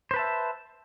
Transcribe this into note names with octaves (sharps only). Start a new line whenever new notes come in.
B4 C5 E5 A5